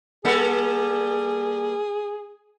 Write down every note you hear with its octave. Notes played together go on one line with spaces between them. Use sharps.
G3 A#3 G#4 A4